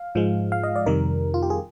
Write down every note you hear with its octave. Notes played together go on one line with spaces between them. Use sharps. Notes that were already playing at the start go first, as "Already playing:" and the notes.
Already playing: F5
G#2 F3 G#3
F5
D#5
D5
F2 C3 D#3 G3 A#4
F4
G4
G#4